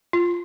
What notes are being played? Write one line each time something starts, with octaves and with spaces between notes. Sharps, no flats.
F4